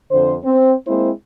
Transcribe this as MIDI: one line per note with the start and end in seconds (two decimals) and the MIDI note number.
0.11 0.34 41
0.11 0.34 50
0.11 0.34 72
0.43 0.72 60
0.87 1.10 56
0.87 1.10 58
0.87 1.10 60
0.87 1.10 64
0.87 1.10 72